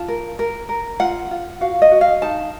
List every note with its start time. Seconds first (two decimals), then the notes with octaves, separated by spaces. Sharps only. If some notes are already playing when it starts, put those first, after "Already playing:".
Already playing: F4 A5
0.08 A#4
0.39 A#4
0.69 A#4
1.00 F4 F#5
1.31 F4
1.61 F#4 F5
1.82 D#5
1.91 F#4
2.01 F5
2.22 D#4 A5